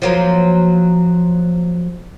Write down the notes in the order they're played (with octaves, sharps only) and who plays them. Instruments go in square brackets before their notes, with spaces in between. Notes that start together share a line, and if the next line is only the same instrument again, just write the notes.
[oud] F3 F#3 A#3